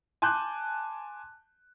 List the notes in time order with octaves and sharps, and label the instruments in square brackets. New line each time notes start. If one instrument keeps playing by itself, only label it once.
[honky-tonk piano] G#5 A5 C6 D6 F#6 G6